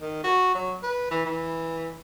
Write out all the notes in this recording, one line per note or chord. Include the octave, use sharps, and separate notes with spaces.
D#3
F#4
F#3
B4
E3
E3